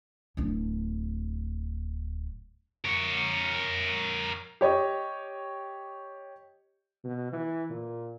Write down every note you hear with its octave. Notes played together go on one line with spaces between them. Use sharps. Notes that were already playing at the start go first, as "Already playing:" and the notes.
D1 D4
A#4 C#5
G4 C#5 D#5
B2
E3
A#2